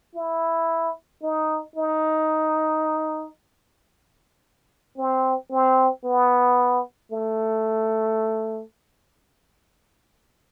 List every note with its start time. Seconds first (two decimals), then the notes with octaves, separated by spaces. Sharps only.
0.15 E4
1.22 D#4
1.76 D#4
4.97 C4
5.51 C4
6.05 B3
7.11 A3